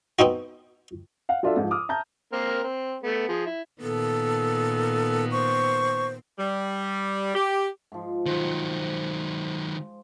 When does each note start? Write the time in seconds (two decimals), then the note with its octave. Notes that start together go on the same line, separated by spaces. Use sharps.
0.19 B3 C4 D#4 F#4
1.29 F5 F#5
1.43 F#3 D4 F4 A4 E5
1.57 G#2 F3
1.71 D6 D#6 F6
1.89 E5 A5 A#5 G6
2.32 A#3 C4 A#4
2.64 C4
3.03 A3 B3
3.29 F3 G#4
3.46 E4
3.81 A#2 D#3 B3 A4
5.32 C5 C#6
6.39 G3
7.35 G4
7.92 G#2 F3
8.26 G#2 D#3 F#3 C5